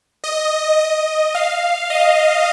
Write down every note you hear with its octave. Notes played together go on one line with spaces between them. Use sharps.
D#5
D#5
F5
D#5